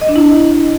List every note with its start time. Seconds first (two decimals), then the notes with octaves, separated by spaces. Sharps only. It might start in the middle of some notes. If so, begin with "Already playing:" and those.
0.01 D#5
0.08 D4
0.16 E4